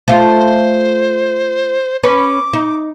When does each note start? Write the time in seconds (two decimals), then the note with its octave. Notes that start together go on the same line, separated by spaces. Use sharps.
0.08 A3 F4 C5
2.03 C#4 B4 D6
2.53 D#4